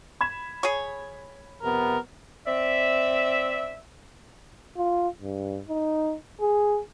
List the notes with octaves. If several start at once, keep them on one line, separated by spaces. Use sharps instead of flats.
B5 G#6 E7
G#4 C#5
F2 C3 B3 A#4
C4 D5 E5
F4
G2
D#4
G#4